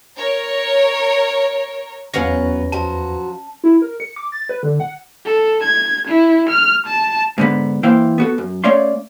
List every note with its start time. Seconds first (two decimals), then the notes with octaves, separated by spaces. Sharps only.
0.16 A#4 C#5
2.14 E2 F#3 B3 C#4 B4 F5 F#5 A#6
2.72 F3 F#3 F#4 A5
3.64 E4
3.82 A#4
4.00 C#7
4.16 D6
4.32 A6
4.49 B4
4.63 D3
4.80 F#5
5.26 A4
5.63 G#6
6.08 E4
6.50 F6
6.86 A5
7.38 G#2 D3 B3
7.83 E3 A#3 E4 C5 F5 G5
8.18 B3 F#4 A4
8.38 F#2
8.64 A3 C#4 C#5 D5 F5 C6